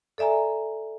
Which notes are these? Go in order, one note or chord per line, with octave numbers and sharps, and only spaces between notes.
A4 D5 E5 G#5 A#5